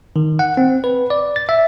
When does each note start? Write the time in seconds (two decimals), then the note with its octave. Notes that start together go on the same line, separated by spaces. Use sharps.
0.16 D#3
0.39 F#5
0.57 C4
0.84 B4
1.10 D5
1.36 A6
1.49 E5